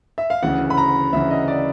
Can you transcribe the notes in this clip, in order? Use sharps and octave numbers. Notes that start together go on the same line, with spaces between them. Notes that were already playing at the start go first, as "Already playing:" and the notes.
E5
F5
D2 C#3 E3 F#5
B5
A#5
D2 C#3 E3 E5
D#5
D5